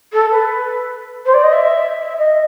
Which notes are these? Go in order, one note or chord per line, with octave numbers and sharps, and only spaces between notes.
A4
B4
C5
D5
D#5
E5
E5
D#5